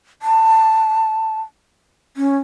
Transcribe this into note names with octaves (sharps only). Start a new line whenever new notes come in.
A5
C#4